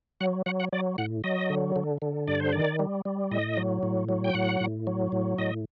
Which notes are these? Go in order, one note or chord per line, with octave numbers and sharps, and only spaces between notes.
F#3 F#5
F#3 F#5
F#5
F#3 D5
A2 F#5
F#3 D#5
D3
D3
D3
G2 D5
C5
D#3 D5
G3
G3
A2 D#5
F#3
A2
F#3
G5
A2 F#5
A2
F#3
A2
A2 D#5